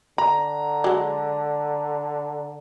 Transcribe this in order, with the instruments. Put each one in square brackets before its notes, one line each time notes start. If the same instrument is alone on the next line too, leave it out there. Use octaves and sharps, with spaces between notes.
[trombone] D3 [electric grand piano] A#5 [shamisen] B5
[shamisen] F#3 G#3